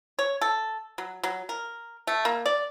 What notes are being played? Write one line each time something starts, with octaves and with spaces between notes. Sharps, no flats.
C#5
A4
F#3
F#3
A#4
A3
A#3
D5